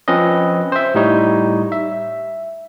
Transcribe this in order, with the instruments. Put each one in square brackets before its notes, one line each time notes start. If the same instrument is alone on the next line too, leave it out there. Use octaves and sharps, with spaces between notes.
[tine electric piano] F3 C4 C#4 B4 D#5
C5 E5
A2 G3 D#4 C#5
E5